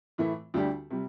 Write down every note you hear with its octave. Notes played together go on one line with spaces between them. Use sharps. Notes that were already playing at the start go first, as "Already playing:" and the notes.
A2 E3 A3 E4
D2 D3 G3 D4 G4
C3 G3